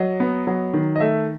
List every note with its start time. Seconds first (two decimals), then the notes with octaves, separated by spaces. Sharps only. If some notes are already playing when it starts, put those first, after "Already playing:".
Already playing: F#3 D#5
0.20 B3
0.47 F#3
0.74 D#3
0.96 D#5
1.00 A3 E5